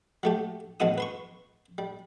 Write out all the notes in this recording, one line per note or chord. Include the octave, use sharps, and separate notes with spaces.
F#3 A3 G4
A1 F#2 G#3 B3 E4 D#6
B4 C6 C#6
G3